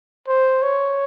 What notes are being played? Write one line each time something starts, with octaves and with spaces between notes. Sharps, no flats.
C5
C#5